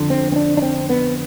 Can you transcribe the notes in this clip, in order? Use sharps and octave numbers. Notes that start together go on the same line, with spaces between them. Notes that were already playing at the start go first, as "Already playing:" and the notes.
Already playing: F2 D3
C4
C4
D4
D4
C4
B3